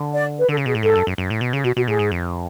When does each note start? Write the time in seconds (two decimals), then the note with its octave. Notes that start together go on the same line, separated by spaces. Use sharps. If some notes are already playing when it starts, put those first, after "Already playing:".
Already playing: D3
0.13 D5
0.39 B4
0.49 D3 A4
0.57 C#3
0.65 B2 G#4
0.75 A2
0.83 G#2 A4
0.96 F#2
1.07 F#2
1.18 F#2
1.30 A2
1.41 B2
1.53 C#3 G#4
1.64 B2 F#4
1.76 B2 F#4
1.88 A2 G#4
1.99 G#2
2.12 F2